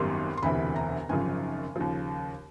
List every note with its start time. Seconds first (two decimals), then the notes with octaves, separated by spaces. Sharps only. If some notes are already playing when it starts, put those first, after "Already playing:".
Already playing: G#1 F#2 D#3 G3 B3 C6
0.37 C6
0.42 E1 D2 C3 E3 B5
0.76 A#5
1.09 G#1 F#2 C#3 F3 G#5
1.76 D#2 C#3 F3